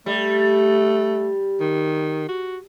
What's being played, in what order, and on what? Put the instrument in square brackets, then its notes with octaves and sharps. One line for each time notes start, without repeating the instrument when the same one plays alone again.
[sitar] G3 [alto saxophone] A3
[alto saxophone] D#3
F#4